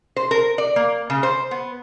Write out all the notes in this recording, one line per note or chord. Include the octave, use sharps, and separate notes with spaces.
C5
A#4
D5
A#3
C#3
C5
B3